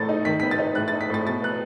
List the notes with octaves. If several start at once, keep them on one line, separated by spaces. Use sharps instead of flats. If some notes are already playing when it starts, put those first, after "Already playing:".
Already playing: A2 A3 A6
D#4
D#3 B6
B3 B6
A6
D#4
A2 F#6
A6
D#4
B6
A2 A6
B2 A6
B3 F#6